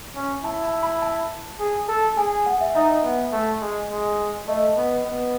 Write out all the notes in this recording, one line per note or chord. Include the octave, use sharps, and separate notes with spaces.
C#4
E4 A5
A5
B5
A5
G#4
A4
G#4 G#5
F#5
E5
D#4 E5
B3
A3
G#3
G#3
A3 D#5
B3
B3